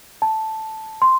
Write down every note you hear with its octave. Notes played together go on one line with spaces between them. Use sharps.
A5
C6